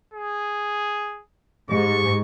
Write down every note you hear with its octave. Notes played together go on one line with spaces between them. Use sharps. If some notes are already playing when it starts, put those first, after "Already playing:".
G#4
G#2 G4 C#6